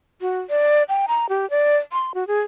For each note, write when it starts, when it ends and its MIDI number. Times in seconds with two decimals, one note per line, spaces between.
0.21 0.40 66
0.50 0.83 74
0.89 1.06 79
1.08 1.29 82
1.29 1.49 67
1.50 1.77 74
1.93 2.12 84
2.14 2.26 66
2.27 2.41 68